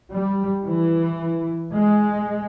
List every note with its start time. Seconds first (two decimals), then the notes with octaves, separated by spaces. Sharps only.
0.13 G3
0.64 E3
1.75 G#3